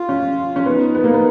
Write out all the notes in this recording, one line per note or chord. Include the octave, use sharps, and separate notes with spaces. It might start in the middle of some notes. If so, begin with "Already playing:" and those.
Already playing: F4
C#4
C#4
B3 D#4
B3
A#3
B3